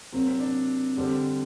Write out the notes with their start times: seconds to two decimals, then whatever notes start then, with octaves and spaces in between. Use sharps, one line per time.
0.12 C3 F#3 A#3 C4 F#4
0.26 C4
0.40 D4
0.97 D3 G3 C4